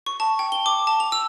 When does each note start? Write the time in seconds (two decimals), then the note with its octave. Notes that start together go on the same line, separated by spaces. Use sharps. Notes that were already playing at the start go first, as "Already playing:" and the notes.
0.06 C#6
0.20 A5
0.39 G5
0.52 G7
0.66 D6
0.87 A5
1.00 F7
1.12 E6